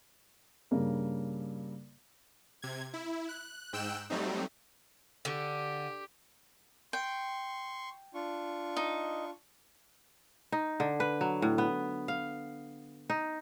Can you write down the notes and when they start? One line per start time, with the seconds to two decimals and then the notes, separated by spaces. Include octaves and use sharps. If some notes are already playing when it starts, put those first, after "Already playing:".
0.71 G2 C#3 A#3
2.62 C3 G#6
2.94 E4
3.29 F#6
3.73 G#2 G5 E6 F#6 E7
4.10 F#3 G3 A3 C4 D#4
5.25 D3 G4
6.93 G5 C6 C#6
8.14 D4 F4 C#6
8.76 D#4
10.52 D#4
10.80 D3
11.00 B4
11.21 F#3
11.42 A2
11.58 B3
12.08 F5
13.10 D#4